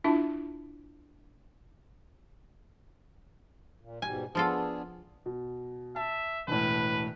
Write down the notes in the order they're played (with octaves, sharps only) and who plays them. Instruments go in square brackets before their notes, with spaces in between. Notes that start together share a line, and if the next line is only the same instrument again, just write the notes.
[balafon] D4 E4 F4 E5 A5
[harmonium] A#2
[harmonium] G#2 B2 G3 [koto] G#5
[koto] F3 F4 A4 [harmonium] B3 D4 G#4
[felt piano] B2
[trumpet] E5 [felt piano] A5
[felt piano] E1 A2 [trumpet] B4